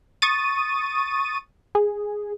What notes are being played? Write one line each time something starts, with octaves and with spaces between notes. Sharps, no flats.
C#6 D#6 A6 D#7
G#4